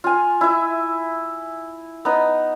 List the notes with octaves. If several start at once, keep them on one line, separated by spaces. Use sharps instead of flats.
F4 G#5
E4 E5
B3 D#4